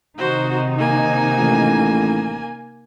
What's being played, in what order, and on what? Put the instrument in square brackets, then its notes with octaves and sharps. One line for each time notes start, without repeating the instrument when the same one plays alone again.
[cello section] C3 D#3 D#4 [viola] F#4 C5
[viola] A#3 G#5
[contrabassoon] A1